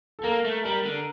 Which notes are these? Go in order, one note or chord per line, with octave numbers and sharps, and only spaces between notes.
A4
A#3 A#4
A3
G3 A#4
D3